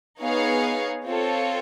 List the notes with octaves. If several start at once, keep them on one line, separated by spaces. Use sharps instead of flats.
B3 D#4 G#4 C#5 F5
C4 F4 A4 C#5